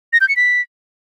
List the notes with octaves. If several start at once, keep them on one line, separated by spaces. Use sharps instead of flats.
A#6
G6
C#7
B6